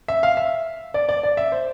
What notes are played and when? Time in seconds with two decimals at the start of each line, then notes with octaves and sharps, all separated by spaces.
0.08 E5
0.23 F5
0.37 E5
0.94 D5
1.09 D5
1.23 D5
1.37 E5
1.52 C5